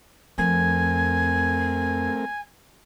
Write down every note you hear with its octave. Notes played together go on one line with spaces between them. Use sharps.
F2 A3 C4 A#4 G#5